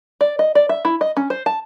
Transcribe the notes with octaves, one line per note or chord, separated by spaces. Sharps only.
D5
D#5
D5
E5
E4
D#5
C#4
C5
A5